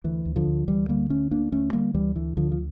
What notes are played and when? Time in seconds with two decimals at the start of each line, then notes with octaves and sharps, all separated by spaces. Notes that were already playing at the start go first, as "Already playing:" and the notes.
0.04 D2 E3
0.25 D2
0.36 D3 F3
0.47 D2
0.67 D2 E3 G3
0.88 D3 G3 A#3
1.10 D2 A3 C#4
1.31 D2 A#3 D4
1.52 D2 A3 C#4
1.73 D3 G3 A#3
1.94 D2 E3 G3
2.16 D3 E3
2.37 D2 D3 F3
2.52 F3